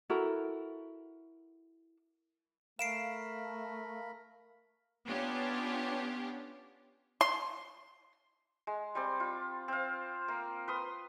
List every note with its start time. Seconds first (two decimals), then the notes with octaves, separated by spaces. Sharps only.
0.10 E4 F#4 A4 A#4
2.79 A3 A#4 F5 B5 C7 D7 E7
5.05 B3 C#4 D4 F4 G4
7.21 C6
8.67 G#3
8.95 G3 C4 D5
9.20 F4
9.68 C4 F5
10.28 A#3
10.68 B4 C6 D#6